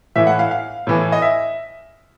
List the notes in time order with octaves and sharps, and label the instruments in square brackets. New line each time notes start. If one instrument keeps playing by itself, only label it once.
[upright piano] A2 E3 E5
F#5
F5
F5
A2 E3
D#5
E5